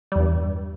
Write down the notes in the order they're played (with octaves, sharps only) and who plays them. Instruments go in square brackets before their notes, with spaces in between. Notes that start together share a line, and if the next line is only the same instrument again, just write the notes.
[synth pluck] G3
E2
G2